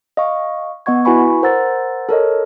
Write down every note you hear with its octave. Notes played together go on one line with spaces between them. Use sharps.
D#5 F5 C#6
B3 D#5 F#5 C#6 G#6
E4 F#4 B4 G#5 B5 C#6
A#4 C5 F#5 A#5 E6 A6
A4 A#4 C#5 D#5